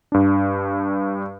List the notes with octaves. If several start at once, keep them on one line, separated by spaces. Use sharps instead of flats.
G2 D4